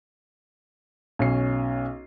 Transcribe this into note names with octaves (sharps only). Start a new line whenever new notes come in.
B1 C#4 C7